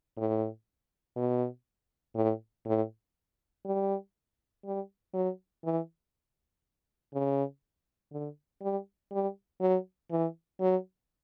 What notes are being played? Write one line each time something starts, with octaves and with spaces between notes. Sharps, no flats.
A2
B2
A2
A2
G3
G3
F#3
E3
C#3
D3
G3
G3
F#3
E3
F#3